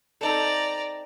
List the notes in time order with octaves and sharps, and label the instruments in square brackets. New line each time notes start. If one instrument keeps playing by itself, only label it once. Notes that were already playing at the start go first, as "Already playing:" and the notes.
[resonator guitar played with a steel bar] C4 D#4 A4 [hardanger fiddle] D5 A#5